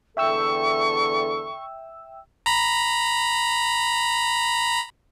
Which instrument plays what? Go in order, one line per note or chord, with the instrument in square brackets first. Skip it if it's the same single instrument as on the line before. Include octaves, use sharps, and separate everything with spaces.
[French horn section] E2 D3 A4 [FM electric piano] E5 G5 E6 [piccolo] C#6
[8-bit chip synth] A#5 B5